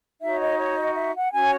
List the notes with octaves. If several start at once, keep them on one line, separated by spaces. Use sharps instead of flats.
D#4 F#4 C#5 E5
D#5
C#5
D#5
E5
F#5
C#4 F#4 C#5 G#5